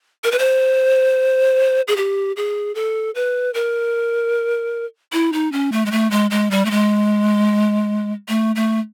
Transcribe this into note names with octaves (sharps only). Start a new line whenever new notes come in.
A#4
B4
C5
G#4
G4
G#4
A4
B4
A#4
E4
D#4
C#4
A3
G#3
A3
G#3
G#3
G3
A3
G#3
A3
A3